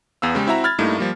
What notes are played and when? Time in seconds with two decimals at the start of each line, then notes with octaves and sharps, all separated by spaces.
0.22 E2 B3 F5 E6
0.35 C#3 G#3 G4
0.47 C4 E4 F#4 E5 A#5
0.64 B5 F6 G#6 A6
0.78 G2 A3 A#3 D#4 E4
0.99 F3 G3 A#3